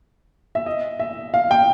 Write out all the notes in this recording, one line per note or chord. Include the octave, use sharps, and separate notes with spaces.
E5
D#5
E5
F5
G5